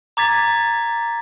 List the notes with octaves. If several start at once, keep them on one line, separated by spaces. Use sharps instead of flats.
A#5 D6 G#6 A6 B6